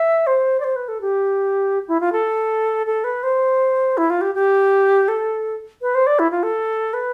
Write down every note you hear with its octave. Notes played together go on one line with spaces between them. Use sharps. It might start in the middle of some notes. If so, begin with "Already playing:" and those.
Already playing: E5
C5
D5
C5
B4
A4
G4
E4
F4
A4
A4
B4
C5
E4
F4
G4
G4
A4
B4
C5
D5
E4
F4
A4
B4